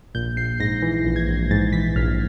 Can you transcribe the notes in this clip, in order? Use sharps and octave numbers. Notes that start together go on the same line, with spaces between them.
A#1 G6
A#1 C7
G#2 A#6
E3
A#1
G#6
A#1
G#2 A6
E3 B6
A#1 F6